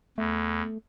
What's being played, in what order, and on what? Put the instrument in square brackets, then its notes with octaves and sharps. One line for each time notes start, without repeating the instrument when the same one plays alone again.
[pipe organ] E2 [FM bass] A3